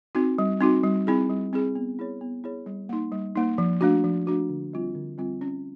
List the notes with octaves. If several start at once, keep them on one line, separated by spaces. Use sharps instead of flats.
C4 D#4 F#4
G3
C4 D#4 F#4
G3
C4 E4 G#4
G3
C4 E4 G#4
B3
E4 G#4 C#5
B3
E4 G#4 C#5
G3
A#3 D#4
G3
A#3 D#4
F3
A3 D4 F#4
F3
A3 D4 F#4
D3
G3 C4 F4
D3
G3 C4 F4
C#4